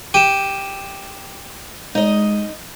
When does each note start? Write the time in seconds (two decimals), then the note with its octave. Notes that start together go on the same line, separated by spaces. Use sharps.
0.14 G4 D#7 E7
1.95 G#3 D#4 D#5